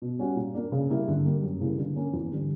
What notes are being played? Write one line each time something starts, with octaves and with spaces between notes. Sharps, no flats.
B2
G3 C#4 F#4
A#2
A#3 D4
C#3
G3 A#3 E4
D3
G3 A#3
F#2
C#3 E3 G3 A#3
D3
A#3 C#4
E2
D3 G3